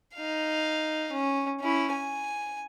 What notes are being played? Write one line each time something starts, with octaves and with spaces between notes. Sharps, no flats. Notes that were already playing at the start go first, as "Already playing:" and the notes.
D#4 F5
C#4
C#4 E4
G#5